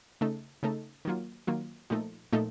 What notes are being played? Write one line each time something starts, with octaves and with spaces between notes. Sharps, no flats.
C#3 A3 D#4 A4
C#3 A3 D#4 A4
D#3 F#3 A#3 F4
D#3 F#3 A#3 F4
A#2 F3 A3 D#4 A4
A#2 F3 A3 D#4 A4